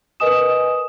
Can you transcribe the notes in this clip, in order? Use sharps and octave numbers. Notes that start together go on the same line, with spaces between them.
A#4 B4 D#5 G#5 D#6 E7